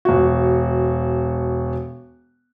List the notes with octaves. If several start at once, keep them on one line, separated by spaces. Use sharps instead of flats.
E1 F#4